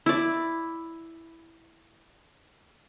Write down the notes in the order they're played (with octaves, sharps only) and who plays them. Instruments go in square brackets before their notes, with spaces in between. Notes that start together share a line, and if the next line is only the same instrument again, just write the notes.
[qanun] E4 D5